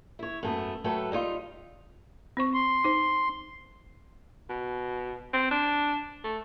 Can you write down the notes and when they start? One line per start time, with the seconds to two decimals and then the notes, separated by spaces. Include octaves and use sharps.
0.19 E4 C#5
0.43 F#2 A3 B3
0.84 F#3 A3 A4 B4 G5
1.12 G3 D#4 F4
2.37 C4 C5 C#6
2.54 C6
2.84 D#4 C5
4.50 B2
5.34 C4
5.51 D4
6.24 A3